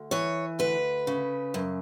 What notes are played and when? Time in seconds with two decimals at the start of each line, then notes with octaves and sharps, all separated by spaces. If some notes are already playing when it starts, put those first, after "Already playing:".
Already playing: D2
0.11 E3 C#5
0.59 D2 B4
1.07 C#3
1.54 F#2